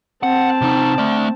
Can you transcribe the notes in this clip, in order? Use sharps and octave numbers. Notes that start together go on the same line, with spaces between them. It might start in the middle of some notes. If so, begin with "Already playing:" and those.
C4 F#5 A5
C3 D#4
A3 D5